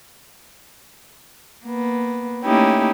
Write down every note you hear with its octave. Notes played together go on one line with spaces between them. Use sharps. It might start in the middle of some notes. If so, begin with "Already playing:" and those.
A#3 B3
A3 A#3 C#4 D#4 E4 G4